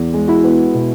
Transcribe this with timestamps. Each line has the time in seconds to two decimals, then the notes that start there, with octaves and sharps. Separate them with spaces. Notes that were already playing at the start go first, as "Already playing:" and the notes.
Already playing: E2
0.14 G#3
0.28 E4 F#4
0.44 B3
0.74 B2